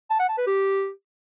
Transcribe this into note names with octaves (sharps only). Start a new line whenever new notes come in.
A5
F#5
A5
B4
G4